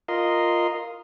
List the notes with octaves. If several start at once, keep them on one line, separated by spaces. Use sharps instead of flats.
F4 A#4 D#5 C6